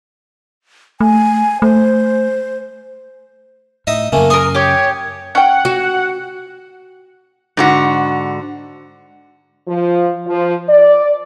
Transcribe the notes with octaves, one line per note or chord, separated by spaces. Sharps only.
A3 G#5
A3 C5
A2 D#4 D#5 E5
F#2 C#3 A3 A#3 G#5
A#4 C6 C#6 D#6
G4 C#5 D6
C#4 F#5 G5
F#4
G#2 D3 F#4
F3
F3
D5